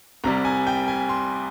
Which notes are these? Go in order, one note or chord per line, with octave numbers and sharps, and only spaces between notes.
C2 C3 G3 A#5
G#5
G5
G#5
C6